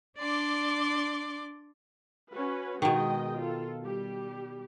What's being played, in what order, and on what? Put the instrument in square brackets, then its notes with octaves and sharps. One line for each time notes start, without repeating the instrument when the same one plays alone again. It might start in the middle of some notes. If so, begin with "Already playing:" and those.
[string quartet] D4 D5 C6 D6
[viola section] C#4 F#4 B4
[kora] B2 D#3 [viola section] G#3 D#5 G5
[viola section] F4 A4
G3 G4